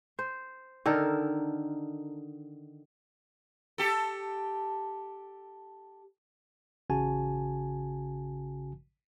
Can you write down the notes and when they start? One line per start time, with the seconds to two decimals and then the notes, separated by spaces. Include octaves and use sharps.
0.19 C5
0.86 D3 D#3 A4 A#4
3.78 G4 A4
6.90 A1 C#3 F#4 G#5 A5